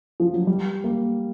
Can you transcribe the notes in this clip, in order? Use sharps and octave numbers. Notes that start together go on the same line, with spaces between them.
F3
F#3
G3
A#3